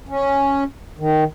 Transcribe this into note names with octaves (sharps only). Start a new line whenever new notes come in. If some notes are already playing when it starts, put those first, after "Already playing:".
C#4
D#3